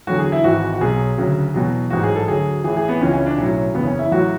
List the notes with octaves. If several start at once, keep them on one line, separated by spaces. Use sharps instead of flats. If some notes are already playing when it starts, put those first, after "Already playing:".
E2 D3 F#3 F#4
G#4
E4
G#1 G#2 E3 F#4
F#4
B1 B2 F#3 G#4
D2 C#3 F#3
E2 B2 F#3
A1 G#2 F#3 F#4
G#4
A4
D2 D3 F#3 G#4
A1 A2 E3 G#4
G#4
B3
C#2 C#3 E3 C#4
C#4
D4
B1 A2 F#3 C#4
F#1 E2 C#3 B3
C#4
E4
A1 A2 F#3 F#4